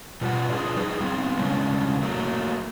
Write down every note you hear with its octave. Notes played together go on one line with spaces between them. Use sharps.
B2 G3 F4 A4 B4 F#5
D4 F4 F#4 G#4 B4
G3 D#4 G#4
G3 B3 C4 E4
C#3 G3 G#3 C#4 D4
F#3 A3 A#3